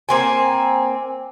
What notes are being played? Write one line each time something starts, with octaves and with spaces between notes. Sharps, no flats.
A#3 C4 G#5